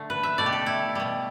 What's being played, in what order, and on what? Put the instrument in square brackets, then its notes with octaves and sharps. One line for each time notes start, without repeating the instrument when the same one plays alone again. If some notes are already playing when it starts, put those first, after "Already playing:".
Already playing: [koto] D3 A3
B4
E5
B2 A3 D5
G4
A4
E4
B2 G3